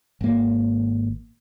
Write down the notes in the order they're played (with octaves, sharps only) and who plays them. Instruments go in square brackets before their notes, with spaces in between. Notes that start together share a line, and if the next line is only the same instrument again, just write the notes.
[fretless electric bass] G#1 A#3